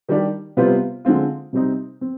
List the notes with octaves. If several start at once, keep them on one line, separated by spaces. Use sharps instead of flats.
D#3 G3 D4 G4
C3 G3 B3 F4 C5
D3 G#3 C4 F4
C3 G3 C4 D#4
C4